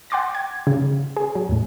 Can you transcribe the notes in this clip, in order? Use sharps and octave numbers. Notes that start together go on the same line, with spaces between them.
F#5 G5 C6 D6 A6 A#6
G5 G#6
C#3
G#4
F#3
E2 A2